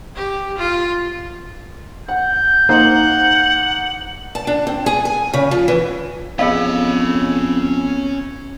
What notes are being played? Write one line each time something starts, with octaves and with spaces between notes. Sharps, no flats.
G4
F4
F#5 G6
A#3 D#4 C5 F#5
A5
D4
C4
G#4
G#5
C#3
F3
E3
F2 B3 C#4 G#4 D#5 F5 B5 E6